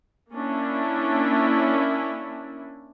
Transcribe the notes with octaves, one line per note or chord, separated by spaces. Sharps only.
A#3 C#4 D4 E4